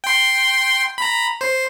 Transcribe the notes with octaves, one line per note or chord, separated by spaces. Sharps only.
G5 C6
A#5 B5
C5